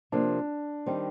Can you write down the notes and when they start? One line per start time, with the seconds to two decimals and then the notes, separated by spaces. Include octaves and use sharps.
0.12 C3 F3 A#3 D4
0.86 D#3 G3 C4 D#4